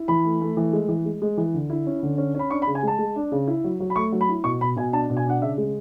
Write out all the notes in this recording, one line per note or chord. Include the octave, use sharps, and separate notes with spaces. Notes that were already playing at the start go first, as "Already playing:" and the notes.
Already playing: E4
E3 B5
A3
A3
E3
G#3
E3
G#3
G#3
E3
D3
E4
C#4
D3
C#4
C#4 B5
D4 C#6
B5
C#3
G#5
G#3 A5
G#3
D4
C#3
E4
F#3
F#3
B5
A3 C#6
F#3
B5
E4
B2 C#6
B2 B5
B2 G#5
D4 A5
B2
G#5
D4 F#5
C#3 E5
G#3